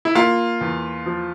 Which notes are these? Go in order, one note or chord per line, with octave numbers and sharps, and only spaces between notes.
E4
A#3 F4
E2
F3